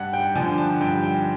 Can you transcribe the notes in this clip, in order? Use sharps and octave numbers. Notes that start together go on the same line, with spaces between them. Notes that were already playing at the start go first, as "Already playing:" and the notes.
Already playing: G2 F#5
G5
D3 F3 G#5
A5
G2 G5
G5